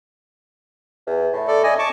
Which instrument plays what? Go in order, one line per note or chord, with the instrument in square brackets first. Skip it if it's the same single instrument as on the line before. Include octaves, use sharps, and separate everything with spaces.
[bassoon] E2
A2
[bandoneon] A4 D5
D5 D#5 G#5
A5 C#6 D6